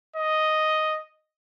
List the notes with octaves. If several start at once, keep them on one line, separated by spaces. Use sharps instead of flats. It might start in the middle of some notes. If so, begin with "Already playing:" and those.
D#5